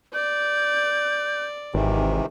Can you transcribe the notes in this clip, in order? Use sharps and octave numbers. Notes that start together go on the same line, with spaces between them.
D5 G6
G#1 C3 D#3 E3